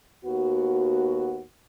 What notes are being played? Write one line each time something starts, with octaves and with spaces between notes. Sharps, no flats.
D#2 B3 F#4